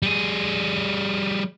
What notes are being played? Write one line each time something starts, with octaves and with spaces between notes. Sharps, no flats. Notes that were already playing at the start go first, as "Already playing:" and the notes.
G3 G#4